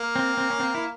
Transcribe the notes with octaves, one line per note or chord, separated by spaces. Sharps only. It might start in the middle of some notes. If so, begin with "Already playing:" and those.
Already playing: A#3
C4
C4
C#4
C4
E4